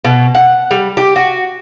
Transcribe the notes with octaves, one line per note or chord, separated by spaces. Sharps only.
B2
F#5
G3
G4
F#4